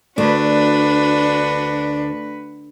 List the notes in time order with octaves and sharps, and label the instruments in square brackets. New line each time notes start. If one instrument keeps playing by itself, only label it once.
[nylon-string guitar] D2 [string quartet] D4 [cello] F#4 B4